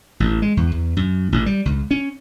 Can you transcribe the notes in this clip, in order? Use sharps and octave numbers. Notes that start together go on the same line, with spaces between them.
A1
G#3
E2
E2
F#2
A1
G3
C#2
C#4